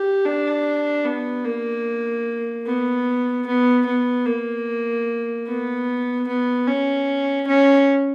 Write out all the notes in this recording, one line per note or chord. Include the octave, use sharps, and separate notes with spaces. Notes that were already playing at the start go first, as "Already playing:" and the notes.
Already playing: G4
D4
B3
A#3
B3
B3
B3
A#3
B3
B3
C#4
C#4